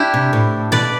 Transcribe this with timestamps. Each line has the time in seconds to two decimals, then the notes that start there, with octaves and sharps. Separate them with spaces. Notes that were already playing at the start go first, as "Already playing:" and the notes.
Already playing: D4 E4 G4
0.14 C3
0.33 A2
0.72 B2 B4 D5